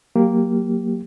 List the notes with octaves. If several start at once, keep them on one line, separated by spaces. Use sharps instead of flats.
F#3 A#3 G4